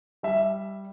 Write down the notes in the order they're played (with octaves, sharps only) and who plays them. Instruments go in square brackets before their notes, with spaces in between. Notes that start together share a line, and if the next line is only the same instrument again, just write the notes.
[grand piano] G3 E5